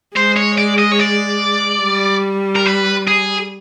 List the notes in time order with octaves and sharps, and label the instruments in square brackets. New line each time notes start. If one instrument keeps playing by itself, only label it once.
[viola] G#3 [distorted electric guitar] C5
[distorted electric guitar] C#5
D5
D#5
C#5
D5
[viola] G3
[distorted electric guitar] A#4
B4
G#4